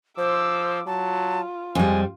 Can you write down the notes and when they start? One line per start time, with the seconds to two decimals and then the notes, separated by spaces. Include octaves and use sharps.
0.18 F3 C5 D6 E6
0.87 F#3 F4 A5
1.75 F2 G3 G#3 G#5